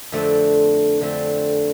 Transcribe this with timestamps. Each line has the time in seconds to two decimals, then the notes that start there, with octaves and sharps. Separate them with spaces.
0.12 F2 D3 A3 C4
1.01 F2 D3 A3 C4